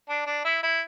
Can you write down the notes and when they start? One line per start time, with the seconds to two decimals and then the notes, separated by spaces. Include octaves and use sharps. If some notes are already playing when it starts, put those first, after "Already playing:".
0.09 D4
0.26 D4
0.45 E4
0.63 E4